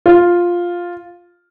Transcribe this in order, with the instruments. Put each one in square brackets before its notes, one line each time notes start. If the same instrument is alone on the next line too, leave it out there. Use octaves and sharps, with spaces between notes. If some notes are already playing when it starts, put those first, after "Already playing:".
[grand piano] F4